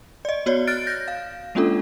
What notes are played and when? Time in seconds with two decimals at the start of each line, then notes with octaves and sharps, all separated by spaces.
0.25 D5 D#5
0.46 B3 F#4 C#5 D5
0.67 F6 F#6 A6 D7
0.87 G6 A#6
1.08 F5
1.55 G#3 A#3 C#4 D4 F4 A4